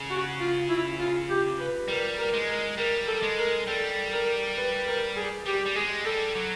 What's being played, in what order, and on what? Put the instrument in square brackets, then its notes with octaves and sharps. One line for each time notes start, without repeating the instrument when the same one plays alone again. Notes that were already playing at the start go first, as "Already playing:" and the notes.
Already playing: [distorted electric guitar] C#3
[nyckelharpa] F#4
F4
E4
F4
G4
B4
[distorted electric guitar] G3 [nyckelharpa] A#4
[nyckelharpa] A#4
[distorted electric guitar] G#3
[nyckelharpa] A#4
[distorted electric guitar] G3 [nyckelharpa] A#4
[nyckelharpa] A4
[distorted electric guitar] G#3
[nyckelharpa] A#4
[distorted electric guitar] G3 [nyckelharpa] A4
[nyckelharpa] A#4
B4
A#4
G#4
[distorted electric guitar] G3 [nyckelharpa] G4
[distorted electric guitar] G3
[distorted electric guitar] G#3 [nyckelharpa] G#4
[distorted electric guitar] G3 [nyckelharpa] A4
[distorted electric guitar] F#3